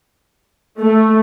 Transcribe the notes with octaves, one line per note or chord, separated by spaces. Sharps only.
A3